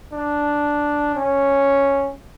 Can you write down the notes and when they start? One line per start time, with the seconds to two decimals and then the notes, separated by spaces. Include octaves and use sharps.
0.13 D4
1.15 C#4